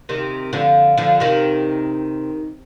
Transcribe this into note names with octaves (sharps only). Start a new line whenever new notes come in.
C3 D#3
D3 F3
D3 F3
C3 D#3